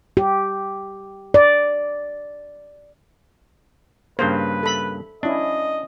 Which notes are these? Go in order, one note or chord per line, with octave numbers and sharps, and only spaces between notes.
G4
D5
G2 C#3 A#3 B4 C5
A4 B5
C#4 D4 E4 D#5